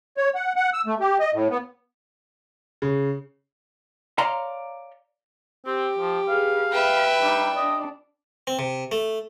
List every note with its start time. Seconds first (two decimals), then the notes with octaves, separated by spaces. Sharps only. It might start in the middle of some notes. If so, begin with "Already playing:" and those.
0.17 C#5
0.35 F#5
0.56 F#5
0.74 E6
0.87 A3
1.00 G4
1.20 D#5
1.34 A2
1.50 B3
2.82 C#3
4.18 C#5 D5 F5 A#5 C6
5.66 C4 G4
5.98 F3
6.29 G#4 B4 F5
6.72 B4 E5 G5 B5
7.22 G3 D4 D#4
7.56 D4 D5 D#5
8.47 C4
8.59 C3
8.92 A3